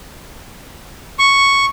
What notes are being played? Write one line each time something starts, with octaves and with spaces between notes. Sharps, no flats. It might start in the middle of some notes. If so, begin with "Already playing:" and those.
C#6